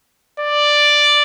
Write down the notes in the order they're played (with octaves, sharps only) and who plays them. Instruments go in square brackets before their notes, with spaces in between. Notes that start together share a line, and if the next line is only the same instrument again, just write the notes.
[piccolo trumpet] D5